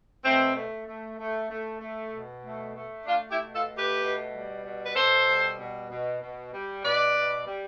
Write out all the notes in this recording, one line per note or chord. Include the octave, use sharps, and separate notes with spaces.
B2 A3 C4
A3
A3
A3
A3
A3
B2
A3
A3
A3 D4 F4
E4 G4
B2
F4 A4
A3
G4 B4
B2
G3
B2
B4
B2 A4 C5
G3
B2
B2
B2
G3
B2 B4 D5
B2
G3